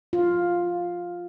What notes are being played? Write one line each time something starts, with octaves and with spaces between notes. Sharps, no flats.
F4